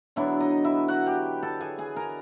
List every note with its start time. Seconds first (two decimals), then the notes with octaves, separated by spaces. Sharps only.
0.16 D3 F#3 B3 D4 E4 E5
0.40 D#4 D#5
0.65 E4 E5
0.88 F#4 F#5
1.06 G4 G5
1.43 A4 A5
1.61 G#4 G#5
1.78 G#4 G#5
1.96 A#4 A#5